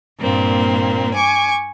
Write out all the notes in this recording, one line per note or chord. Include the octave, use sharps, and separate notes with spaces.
G2 A#2 A#3 C4
G#5 C#6 D6